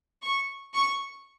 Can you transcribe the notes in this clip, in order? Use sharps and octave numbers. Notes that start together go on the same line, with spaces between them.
C#6
C#6